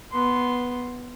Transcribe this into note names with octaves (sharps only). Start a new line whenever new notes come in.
B3 C6